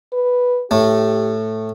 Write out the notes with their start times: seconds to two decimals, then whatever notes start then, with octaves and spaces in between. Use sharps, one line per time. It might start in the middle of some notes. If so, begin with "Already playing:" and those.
0.12 B4
0.71 A2 A3 G4